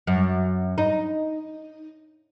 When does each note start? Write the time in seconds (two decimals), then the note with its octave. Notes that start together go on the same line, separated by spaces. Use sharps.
0.07 F#2
0.78 D#4